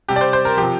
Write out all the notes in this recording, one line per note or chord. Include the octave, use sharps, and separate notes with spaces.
C3 G3 G4
D5
C5
C5
A#4
C3 F3 G4